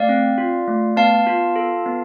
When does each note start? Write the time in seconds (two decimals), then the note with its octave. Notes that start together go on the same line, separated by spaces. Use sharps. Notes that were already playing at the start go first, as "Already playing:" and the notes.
Already playing: A3 D5 F5
0.09 C4
0.38 F4
0.68 A3
0.96 B3 F5 A5
1.27 F4
1.56 A4
1.86 B3